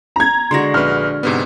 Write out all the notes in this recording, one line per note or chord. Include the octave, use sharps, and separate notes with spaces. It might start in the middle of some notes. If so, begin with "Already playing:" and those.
A#5 G#6
D3 G#3 F#4 C6 A#6
A#1 B4 F6
G#2 C3 B3